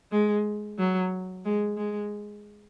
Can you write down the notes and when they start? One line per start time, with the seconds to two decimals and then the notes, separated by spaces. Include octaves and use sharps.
0.12 G#3
0.78 F#3
1.45 G#3
1.77 G#3